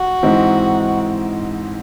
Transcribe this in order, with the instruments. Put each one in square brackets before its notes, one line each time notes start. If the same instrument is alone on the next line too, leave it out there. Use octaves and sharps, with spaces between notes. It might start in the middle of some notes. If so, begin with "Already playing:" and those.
Already playing: [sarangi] F#4
[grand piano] G#2 E3 C4 D#4